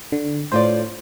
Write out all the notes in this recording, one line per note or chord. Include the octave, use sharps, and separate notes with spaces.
D3
A2 F4 C5 D5